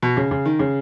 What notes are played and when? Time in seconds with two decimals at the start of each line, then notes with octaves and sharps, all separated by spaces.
0.02 B2
0.17 C#3
0.31 C#3
0.45 D#3
0.59 C#3